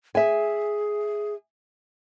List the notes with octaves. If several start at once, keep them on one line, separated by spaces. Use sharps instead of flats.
G#4 E5 G#5